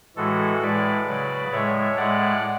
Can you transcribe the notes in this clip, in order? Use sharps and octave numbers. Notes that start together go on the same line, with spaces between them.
A2 E3 G#3 F#4 A4
A2 G#3 B4 D5
C#3 F#3
A2 G#3 C#5 E5
A2 G#3 D5 F#5